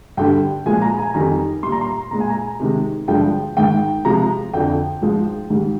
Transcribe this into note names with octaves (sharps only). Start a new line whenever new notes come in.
G2 D3 G3 G5
A#2 F3 G#3 G#5
A#5
G#5
F2 D#3 G3 A#5
A#2 G3 C6
A#5
C6
A#2 G#3 A#5
G#5
A#5
C3 D#3 G#3
G2 D3 F3 G#3 G5
G#2 D#3 G#3 G5
C3 F3 G#3 A#5
F2 D3 F3 G5
G#2 F3 G#3
G#2 D#3 G3